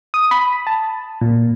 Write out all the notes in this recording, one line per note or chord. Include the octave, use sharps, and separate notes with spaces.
D#6
B5
A5
A#2